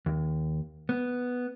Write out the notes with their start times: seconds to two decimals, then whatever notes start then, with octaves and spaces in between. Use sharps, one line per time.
0.06 D#2
0.89 B3